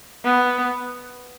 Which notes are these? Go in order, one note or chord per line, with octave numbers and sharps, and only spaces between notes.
B3